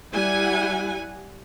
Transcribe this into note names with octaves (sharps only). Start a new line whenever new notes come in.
G3 E4 F#5 G#5